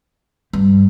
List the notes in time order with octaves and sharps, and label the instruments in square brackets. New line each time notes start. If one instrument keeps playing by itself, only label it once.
[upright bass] G2